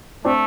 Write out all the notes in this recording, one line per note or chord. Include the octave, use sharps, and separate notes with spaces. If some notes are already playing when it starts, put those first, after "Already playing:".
A3 C4 D4